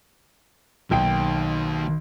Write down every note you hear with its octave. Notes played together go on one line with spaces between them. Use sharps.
B1 D#3 A#3 G5 D7